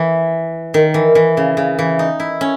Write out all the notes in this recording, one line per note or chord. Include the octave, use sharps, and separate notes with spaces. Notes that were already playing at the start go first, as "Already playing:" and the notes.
Already playing: E3
D#3
E3
E3
C#3
C#3
E3
D#4
E4
C#4